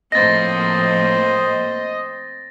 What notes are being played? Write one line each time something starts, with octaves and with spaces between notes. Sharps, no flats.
A2 F3 A#3 C4 C5 D#5 A6 A#6